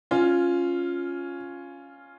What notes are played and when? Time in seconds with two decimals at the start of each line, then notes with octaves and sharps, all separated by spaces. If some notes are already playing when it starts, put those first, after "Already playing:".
0.11 C#4 F4